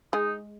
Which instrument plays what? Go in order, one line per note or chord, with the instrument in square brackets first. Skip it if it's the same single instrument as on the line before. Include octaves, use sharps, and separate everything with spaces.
[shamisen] G#3 G#4 [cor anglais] D#4